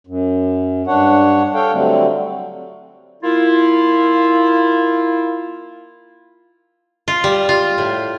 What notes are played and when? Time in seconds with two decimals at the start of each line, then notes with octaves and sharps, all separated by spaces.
0.07 F#2
0.87 G2 D4 C#5 F#5
1.54 A4 C#5 F5 G5
1.73 D3 F#3 G3 A3 C4
3.24 A#3 E4 F4
7.08 F4
7.24 G3
7.49 F4
7.78 A2